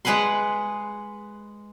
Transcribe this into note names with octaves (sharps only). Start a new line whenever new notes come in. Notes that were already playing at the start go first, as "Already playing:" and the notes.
G#3 G#4 B4 F#5 C6